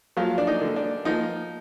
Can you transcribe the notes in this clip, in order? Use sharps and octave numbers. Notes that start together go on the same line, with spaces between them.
F3 F#3 F4
D4
D#4
D3
D4
F3 D#4